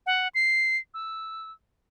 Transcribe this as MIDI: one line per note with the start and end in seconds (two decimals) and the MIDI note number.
0.06 0.28 78
0.35 0.77 96
0.94 1.51 88